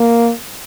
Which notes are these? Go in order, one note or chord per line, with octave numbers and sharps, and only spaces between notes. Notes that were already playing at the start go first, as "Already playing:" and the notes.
Already playing: A#3